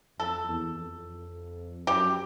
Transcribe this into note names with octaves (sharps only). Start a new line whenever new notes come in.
F2 A4
E2
F2
F#2 G4